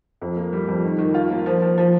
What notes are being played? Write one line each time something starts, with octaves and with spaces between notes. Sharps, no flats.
F2
A#3
G3
F2
D#3
D#3
F4
A#3
F3
F3
F3